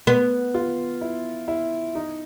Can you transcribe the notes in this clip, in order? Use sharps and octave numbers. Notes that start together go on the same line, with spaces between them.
B3
F4
E4
E4
D#4